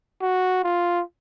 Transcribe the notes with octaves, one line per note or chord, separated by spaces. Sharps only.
F#4
F4